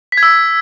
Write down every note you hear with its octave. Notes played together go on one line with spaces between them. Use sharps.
B6
G#6
E6